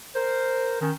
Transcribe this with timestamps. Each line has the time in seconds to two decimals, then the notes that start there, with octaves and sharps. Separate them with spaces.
0.16 A#4 C5
0.81 D#3 C#4